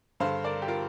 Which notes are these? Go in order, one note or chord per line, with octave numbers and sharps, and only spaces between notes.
G2 D3 C5 F5
A#4 D5
G4
F4 A#4